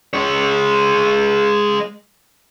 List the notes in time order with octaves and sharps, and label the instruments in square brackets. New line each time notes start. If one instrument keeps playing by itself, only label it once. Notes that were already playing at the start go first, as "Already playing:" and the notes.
[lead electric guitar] G#3 C#5